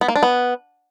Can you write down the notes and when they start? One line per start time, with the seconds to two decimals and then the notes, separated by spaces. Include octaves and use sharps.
0.01 B3
0.08 A#3
0.16 D4
0.23 B3